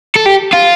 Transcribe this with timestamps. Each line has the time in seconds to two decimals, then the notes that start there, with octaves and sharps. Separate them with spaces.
0.16 A4
0.26 G4
0.53 F4